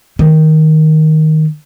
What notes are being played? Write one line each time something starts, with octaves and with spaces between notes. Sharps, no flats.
D#3